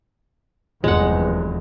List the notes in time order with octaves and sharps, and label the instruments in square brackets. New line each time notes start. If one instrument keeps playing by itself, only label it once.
[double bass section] F1 E2 G2 [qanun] G#3 F#5